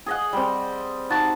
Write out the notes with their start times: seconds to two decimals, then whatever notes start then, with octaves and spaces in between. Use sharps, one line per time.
0.06 G#4 D#5 F#5
0.33 G3 C4
1.10 D#4 F#4 A5